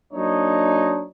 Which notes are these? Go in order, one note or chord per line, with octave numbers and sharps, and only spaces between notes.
F#3 A#3 D4 D#4 C#5 D#5